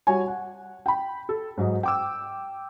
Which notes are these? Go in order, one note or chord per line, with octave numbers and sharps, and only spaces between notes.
G3 F#4 C#5 G#5
F#5
G5 B5
A4
G#2 F#3 D#5
G5 D6 E6